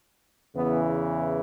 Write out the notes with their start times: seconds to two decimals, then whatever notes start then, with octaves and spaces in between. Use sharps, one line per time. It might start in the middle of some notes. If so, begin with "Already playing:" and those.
0.55 E2 C#3 E3 B3